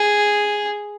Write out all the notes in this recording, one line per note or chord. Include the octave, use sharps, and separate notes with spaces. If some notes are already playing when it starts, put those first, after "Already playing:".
Already playing: G#4